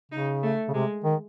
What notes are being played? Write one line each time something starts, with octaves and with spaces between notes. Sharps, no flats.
C#3 D#4
A3
C#3
C3 G#3
D#3